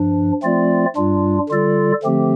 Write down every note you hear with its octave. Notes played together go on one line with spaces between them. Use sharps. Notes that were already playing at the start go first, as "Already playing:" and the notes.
Already playing: G2 F3 D4
F3 A3 C4 F4 D5
G2 G3 D4 F4
D3 G3 F4 A4 D5
D3 F3 A3 C4 G4